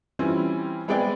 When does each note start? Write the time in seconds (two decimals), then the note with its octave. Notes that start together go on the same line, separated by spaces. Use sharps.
0.19 E3 G3 C4 C#4 E4 F4
0.88 G#3 B3 C4 G#4 D5 G5